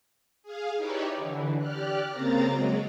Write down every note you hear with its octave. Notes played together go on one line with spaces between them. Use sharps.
G#4 F5
D#4 E4 G4 B4 C#5 D5
D3 E3
G4 D5 F6 F#6
C#3 A#3 C4 A#5 A6
F#3 G#3